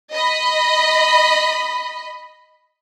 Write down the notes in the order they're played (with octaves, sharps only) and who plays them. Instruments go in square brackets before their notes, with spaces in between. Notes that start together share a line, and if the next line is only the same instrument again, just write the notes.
[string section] D#5 B5